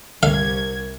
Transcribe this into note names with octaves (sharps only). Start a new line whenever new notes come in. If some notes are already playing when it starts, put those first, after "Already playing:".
C2 D3 A#4 F5 G#6